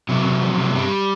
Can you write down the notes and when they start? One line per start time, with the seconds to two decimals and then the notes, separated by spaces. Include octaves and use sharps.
0.09 C3 F#3
0.25 C3
0.42 F3
0.58 C3
0.70 G#3
0.75 G2 G3